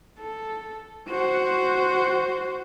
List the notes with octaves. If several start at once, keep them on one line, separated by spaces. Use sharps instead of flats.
A4
F#4 C5